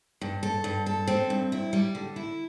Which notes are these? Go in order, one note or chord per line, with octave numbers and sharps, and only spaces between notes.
G2
A4
G2
A4
C4
G2
E4
G3
D3
E4